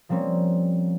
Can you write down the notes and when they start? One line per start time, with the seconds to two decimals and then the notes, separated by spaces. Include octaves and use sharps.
0.09 F3 G3 A#3 C4 C#4